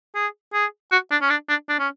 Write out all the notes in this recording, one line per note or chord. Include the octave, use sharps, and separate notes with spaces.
G#4
G#4
F#4
D4
C#4
D4
D4
D4
C#4